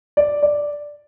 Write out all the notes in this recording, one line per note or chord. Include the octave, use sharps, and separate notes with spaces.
D5
D5